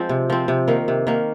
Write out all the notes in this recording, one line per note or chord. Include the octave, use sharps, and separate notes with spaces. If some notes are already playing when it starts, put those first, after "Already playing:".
Already playing: F3 G#3 C4
C3
F3 C4
C3
D#3 A#3
C3
D#3 A#3